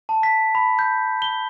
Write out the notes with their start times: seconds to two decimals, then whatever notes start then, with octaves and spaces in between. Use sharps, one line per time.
0.09 A5
0.23 B6
0.55 B5
0.79 G6
1.22 G7